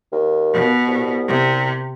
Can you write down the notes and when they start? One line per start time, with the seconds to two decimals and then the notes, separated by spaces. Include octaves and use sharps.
0.12 D#2
0.54 B2
0.88 C2
1.28 C3